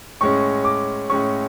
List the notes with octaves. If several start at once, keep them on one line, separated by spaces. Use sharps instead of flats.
A2 G#3 C#4 C#6
D6
A2 G#3 C#4 C#6